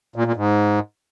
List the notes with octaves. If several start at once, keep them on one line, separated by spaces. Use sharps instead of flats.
A#2
A#2
G#2